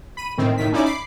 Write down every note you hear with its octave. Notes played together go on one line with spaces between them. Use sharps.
B5 D#7
A2 D#3 C4
A2 D#3 B6
C#4 D#4 E4 D5 D6
B5 D6 C7